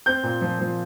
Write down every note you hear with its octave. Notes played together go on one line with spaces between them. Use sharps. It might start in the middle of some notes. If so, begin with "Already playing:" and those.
C4 G6
A#2
F3
F3